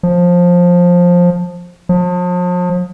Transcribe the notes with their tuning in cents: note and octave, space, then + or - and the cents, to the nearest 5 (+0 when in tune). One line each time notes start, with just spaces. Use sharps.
F3 +15
F3 +40